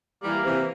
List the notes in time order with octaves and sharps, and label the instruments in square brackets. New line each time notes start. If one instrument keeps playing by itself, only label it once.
[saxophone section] E3 G3 [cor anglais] A#3
[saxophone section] C3 E3